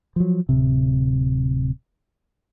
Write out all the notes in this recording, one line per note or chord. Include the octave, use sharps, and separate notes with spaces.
F3 F#3
D1 C3